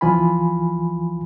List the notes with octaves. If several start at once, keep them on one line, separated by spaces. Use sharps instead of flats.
C2 E3 F3 F4 G#5 B5